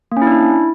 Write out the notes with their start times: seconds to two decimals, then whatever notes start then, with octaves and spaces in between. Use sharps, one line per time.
0.12 A#3
0.17 C#4
0.22 E4
0.27 D4
0.32 E4